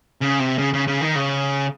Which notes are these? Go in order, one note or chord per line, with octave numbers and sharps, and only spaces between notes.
C#3
C3
C#3
C#3
C#3
D#3
C#3